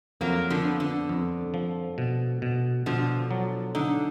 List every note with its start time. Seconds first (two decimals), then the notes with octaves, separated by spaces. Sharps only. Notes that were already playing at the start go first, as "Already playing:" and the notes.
0.21 F2 F#3 A#3
0.50 D3 F3
0.65 B3
0.80 D3
1.09 F2
1.54 F3
1.98 B2
2.42 B2
2.86 B2 D3 F3
3.31 F#3
3.75 D3 D#4